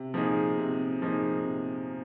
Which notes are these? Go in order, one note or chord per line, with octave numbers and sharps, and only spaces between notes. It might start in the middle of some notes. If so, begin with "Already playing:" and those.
Already playing: C3
F3 A#3 D#4 G#4
C3
F3 A#3 D#4 G#4
C3